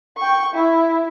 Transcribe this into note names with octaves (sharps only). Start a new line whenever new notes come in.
G5 C#6
E4